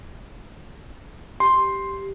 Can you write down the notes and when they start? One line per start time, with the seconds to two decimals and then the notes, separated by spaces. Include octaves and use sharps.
1.40 G4 C6